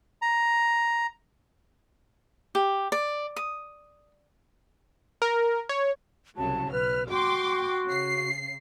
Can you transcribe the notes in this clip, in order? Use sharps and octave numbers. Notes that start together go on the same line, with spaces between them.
A#5
G4
D5
D#6
A#4
C#5
C2 C#3 F#3 A5
B1 B4 F6
F#4 G5 C6 D6
C#3 C7